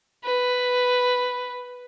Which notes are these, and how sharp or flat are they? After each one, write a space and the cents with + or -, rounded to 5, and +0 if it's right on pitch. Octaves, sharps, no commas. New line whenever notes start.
B4 +5